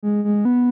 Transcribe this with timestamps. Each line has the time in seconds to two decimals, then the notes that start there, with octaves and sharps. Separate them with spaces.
0.03 G#3
0.24 G#3
0.45 B3